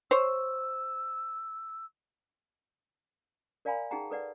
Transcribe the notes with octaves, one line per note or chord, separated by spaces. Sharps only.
C5 C#5 E6
A#4 D5 F5 G#5 A#5 B5
D#4 G#4 F#5 G5 A#5
A4 B4 D5 F#5